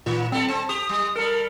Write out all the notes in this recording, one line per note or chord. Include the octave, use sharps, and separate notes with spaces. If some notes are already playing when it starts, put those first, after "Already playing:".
A#2 D#3 A#3
G3 C4 A4
C4 A5
G4 D#6
G3
G3 A4 A#4